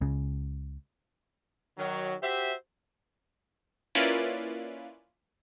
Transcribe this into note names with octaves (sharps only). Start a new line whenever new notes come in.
C#2 C#3
D#3 F#3
F#4 G4 C5 E5
A#3 C#4 E4 F4 B4 D5